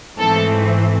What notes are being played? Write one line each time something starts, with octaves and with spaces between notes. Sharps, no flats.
G#2 E3 A3 C4 A4